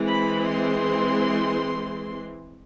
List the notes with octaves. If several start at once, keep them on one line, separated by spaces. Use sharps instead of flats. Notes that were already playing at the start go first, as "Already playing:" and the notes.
Already playing: E3 G#3 C4
B5
C6